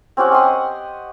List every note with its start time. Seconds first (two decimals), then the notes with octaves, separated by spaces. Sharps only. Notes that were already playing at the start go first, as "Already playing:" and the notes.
0.17 C4 C#4 G4 F#5
0.32 D#5 C6 C#6